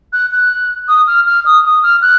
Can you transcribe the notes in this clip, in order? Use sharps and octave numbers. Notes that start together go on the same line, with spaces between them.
F#6
F#6
D#6
F6
F6
D#6
D#6
F6
F#6